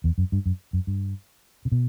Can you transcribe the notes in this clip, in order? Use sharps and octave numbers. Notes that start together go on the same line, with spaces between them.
E2
F#2
G2
F#2
F#2
G2
C3
B2